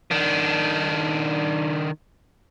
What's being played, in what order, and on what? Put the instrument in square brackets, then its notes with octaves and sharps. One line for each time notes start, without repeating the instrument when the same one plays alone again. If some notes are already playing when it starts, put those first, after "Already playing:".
[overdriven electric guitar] D#3 D4